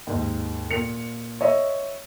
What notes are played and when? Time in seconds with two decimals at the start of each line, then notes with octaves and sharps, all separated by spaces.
0.07 D#2 G#2
0.70 A#2 C#7 F7
1.41 C#5 D#5 E5